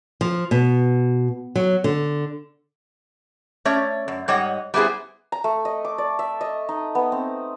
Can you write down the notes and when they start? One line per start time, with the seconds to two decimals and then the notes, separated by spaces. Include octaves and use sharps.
0.21 F3
0.51 B2
1.56 F#3
1.84 D3
3.65 A3 C#4 C#5 D5
4.08 F#2
4.28 G#2 G3 C#5 D#5 F#5
4.74 G3 B3 E4 G#4 C5
5.32 A#5
5.44 A3
5.65 D#5
5.85 D6
5.98 D5
6.19 E5
6.41 D#5
6.69 D#4
6.95 B3
7.12 C4